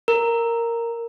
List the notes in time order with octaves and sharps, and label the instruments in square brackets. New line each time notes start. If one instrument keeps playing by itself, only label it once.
[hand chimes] A#4